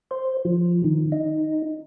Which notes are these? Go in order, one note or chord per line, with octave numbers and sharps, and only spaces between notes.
C5
F3
D#3
D#4